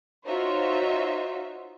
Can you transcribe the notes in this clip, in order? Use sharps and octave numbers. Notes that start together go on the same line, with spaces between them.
D#4 F4 F#4 C5 C#5 E5